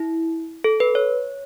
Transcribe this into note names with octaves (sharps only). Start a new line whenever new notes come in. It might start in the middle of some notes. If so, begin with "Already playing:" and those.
Already playing: E4
A4
B4
C#5